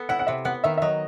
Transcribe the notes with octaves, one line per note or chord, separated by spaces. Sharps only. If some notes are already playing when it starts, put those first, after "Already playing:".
Already playing: B3 A4
E4 F#5
F#5
C3 E5
B3 F#5
D#3 E5
E5
F#3 D#5